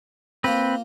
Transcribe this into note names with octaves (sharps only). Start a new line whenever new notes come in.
A#3 C4 F4 B4 C5